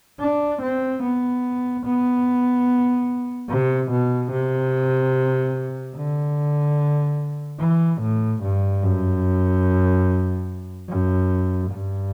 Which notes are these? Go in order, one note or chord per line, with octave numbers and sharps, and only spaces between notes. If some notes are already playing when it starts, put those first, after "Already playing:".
D4
C4
B3
B3
C3
B2
C3
D3
E3
A2
G2
F#2
F#2
G2